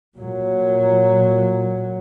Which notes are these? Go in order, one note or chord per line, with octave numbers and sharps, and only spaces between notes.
A#2 F#3